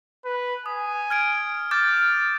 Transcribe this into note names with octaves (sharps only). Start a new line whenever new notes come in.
B4
G#5 D#6
F6 G#6 D7
D6 F6 G6 A6